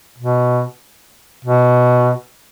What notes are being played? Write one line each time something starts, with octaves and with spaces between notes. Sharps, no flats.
B2
B2